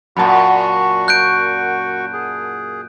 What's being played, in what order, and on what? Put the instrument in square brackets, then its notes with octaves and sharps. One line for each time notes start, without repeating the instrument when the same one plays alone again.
[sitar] F#2 A#2 [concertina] F#4 C#6 [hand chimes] F#5 A5 B5
[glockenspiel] F#6 G6 D7
[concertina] G#4